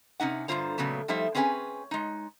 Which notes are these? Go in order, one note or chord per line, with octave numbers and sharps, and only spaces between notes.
C3 C#4 D#4 F#5
G2 D3 F3 F4 C5 A#5
A#2 C#3 F#3 A3 B3
F3 G3 A3 D#4 C5 E5
C4 C#4 G#4 B4 F5 G#5
G#3 D#4